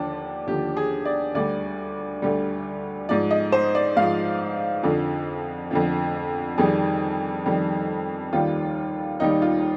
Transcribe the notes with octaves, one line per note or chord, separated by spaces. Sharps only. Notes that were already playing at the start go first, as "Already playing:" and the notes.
Already playing: D#2 D3 F3 D4
D#2 D3 F3 G4
G#4
D5
D2 D3 G3 D5
D2 D3 G3
G#2 F3 D5
D#5
C5
D5
G#2 F3 F5
F2 D3 F3
F2 D3 F3
F2 D#3 G3 G#4
F2 D#3 G3
D#2 D#3 G3 F4
D#2 D#3 G3 D#4
F4